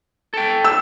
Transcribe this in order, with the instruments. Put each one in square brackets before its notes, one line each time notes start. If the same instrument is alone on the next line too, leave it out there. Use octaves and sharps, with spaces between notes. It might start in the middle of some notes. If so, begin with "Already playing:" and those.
[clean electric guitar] A4 G5
[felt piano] E6